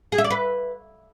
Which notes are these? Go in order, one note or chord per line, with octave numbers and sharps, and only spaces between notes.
G#4
E5
D5
B4